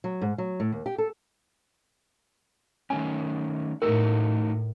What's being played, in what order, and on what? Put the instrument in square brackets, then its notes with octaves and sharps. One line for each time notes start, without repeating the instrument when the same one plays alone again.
[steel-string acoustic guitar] F#3
G#2
F#3
A2
D#2
G4
A4
[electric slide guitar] D#3 A3 C#4 [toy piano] G#5
[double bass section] A2 [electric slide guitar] A3 D#4 F#4 [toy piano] A#4